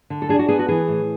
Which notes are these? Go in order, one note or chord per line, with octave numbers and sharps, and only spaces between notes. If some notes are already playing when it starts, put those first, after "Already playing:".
D3
A4
D4 G#4
F#4
B3 G#4
F#4
E3 G#4
A2